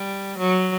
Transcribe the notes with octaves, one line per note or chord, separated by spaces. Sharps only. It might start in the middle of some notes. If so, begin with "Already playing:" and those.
Already playing: G3
F#3